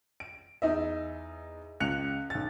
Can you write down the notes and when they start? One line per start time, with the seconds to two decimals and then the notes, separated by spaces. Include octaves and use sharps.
0.20 D7
0.62 E2 D#4 D#5 E5
1.80 C#2 F#6 C#7 F7
2.30 B1 A6